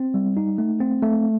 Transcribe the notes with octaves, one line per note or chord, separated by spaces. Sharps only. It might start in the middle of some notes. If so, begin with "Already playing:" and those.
Already playing: C4
G3
D#4
A3
C4
A3